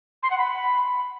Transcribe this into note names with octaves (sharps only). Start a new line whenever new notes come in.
C6
F#5
B5